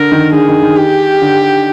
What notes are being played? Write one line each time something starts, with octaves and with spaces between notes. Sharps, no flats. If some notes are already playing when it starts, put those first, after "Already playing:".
Already playing: D3 A#4
D#3
D3 G#4
D#3
D#3
G4
D3